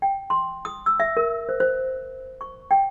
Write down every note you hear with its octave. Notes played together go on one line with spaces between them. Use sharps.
G5
C6
D#6
E6
E5
A#4
C5
C5
C#6
G5